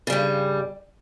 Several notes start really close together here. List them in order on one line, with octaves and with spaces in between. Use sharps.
C#3 G3 G2